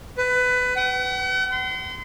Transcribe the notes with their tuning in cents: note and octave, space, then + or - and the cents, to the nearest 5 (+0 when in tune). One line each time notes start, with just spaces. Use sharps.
B4 +20
F#5 +40
C6 -35